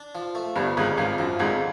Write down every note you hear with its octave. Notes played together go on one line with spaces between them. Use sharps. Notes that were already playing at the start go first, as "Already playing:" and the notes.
Already playing: D4
F3
A3
G1 G2 F3
G#1 G#2 C#3
G#1 G#2 F3
F#2 F3
G#1 G#2 D3